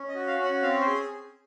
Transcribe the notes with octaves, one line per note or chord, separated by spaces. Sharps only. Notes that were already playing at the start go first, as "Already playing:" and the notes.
Already playing: C#4
D#5
F#4
F5
C#4
F#5
C4 F5
C5
G#4